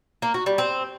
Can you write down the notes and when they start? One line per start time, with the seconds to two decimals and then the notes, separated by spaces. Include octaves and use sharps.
0.22 A#3
0.34 F#4
0.46 G3
0.58 C4